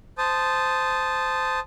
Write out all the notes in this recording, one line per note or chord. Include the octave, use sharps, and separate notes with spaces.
C5 A5 D#6